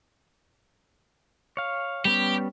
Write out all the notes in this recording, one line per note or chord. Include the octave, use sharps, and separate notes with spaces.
C#5 F5
G3 B3 C#4 G4